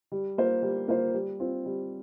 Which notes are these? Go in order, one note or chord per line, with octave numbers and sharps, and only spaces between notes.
G3
A#3 F4 C5
G3
A#3 F4 C5
G3
C4 F4
G3